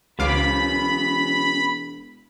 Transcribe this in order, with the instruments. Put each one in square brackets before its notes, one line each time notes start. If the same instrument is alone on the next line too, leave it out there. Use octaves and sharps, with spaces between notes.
[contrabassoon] E1 [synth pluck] C#2 F5 D6 [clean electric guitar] F#3 B3 C#4 [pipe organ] B5